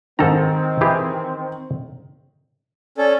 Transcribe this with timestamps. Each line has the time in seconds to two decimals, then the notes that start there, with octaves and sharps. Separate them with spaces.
0.19 G#2 D#3 C4 A4 A#5
0.81 E3 G4 G#4
2.98 C#4 A4 D5